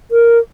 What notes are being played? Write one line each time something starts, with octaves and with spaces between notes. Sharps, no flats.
A#4